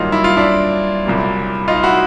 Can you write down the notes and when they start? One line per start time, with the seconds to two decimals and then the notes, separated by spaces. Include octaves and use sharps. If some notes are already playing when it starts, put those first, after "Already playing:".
Already playing: G2 D#3 F#3 A#3 D#4 F4
0.12 E4
0.24 F4
0.37 D4 E4
1.06 C2 A#2 F#3 A#3
1.68 D#4 F4
1.83 E4 F#4